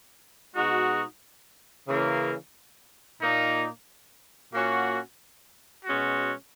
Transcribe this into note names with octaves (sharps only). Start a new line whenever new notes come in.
B2 G#3 D#4 F#4
C#3 E3 A#3
A#2 A#3 D#4
A#2 A#3 C#4 F#4
B2 G#3 C#4 F#4